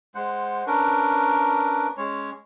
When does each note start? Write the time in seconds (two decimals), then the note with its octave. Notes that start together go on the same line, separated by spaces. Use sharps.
0.15 G#3 C5 F#5
0.67 C#4 D4 A#4 B4
1.97 G#3 C#4 C#5